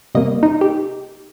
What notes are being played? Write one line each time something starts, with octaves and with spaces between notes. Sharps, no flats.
C3 G3 A#3 D#5
D#4
G4